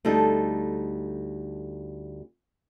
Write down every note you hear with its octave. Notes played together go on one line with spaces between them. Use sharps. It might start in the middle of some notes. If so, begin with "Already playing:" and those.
D2 G3 D#4 A4